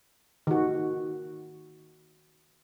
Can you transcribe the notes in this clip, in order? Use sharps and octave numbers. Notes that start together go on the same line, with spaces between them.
D#3 F#4